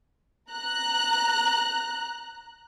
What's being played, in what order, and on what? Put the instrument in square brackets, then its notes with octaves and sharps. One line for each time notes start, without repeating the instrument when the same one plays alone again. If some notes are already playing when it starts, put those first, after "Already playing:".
[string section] A#5 F#6